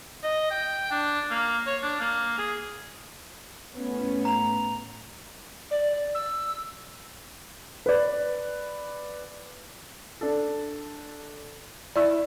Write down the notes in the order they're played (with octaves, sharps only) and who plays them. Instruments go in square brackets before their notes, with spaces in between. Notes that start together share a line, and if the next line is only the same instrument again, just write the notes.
[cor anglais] D#5
G5
D4
A#3
C#5
D4
A#3
G#4
[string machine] A2 A3 [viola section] B3 [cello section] C#4
[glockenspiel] A#5 F7
[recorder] D5
E6
[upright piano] B4 D5
[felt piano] D4 A4
[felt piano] E4 E6 [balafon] D5